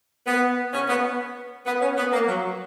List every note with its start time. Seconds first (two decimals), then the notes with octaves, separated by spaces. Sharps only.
0.27 B3
0.74 C#4
0.88 B3
1.66 B3
1.81 C#4
1.98 B3
2.12 A#3
2.28 F#3